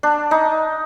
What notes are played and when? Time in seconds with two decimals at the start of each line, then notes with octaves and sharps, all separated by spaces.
0.03 D4
0.31 D#4